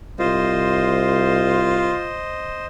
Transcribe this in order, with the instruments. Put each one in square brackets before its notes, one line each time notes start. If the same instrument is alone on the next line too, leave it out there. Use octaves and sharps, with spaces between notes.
[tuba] C2 [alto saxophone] F4 [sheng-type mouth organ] C5 D#5